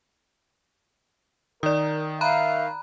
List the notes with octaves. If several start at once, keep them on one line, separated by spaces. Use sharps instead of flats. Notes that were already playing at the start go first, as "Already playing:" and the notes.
D#3 A#4 D5 D#6
E5 F5 A#5 B5 F#6